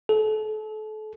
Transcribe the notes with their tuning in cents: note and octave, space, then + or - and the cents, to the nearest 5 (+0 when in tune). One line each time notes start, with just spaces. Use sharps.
A4 -35